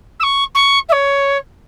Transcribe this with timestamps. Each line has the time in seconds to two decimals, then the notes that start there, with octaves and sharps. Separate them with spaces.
0.20 E6
0.23 C#6
0.55 C#6
0.89 E5
0.92 C#5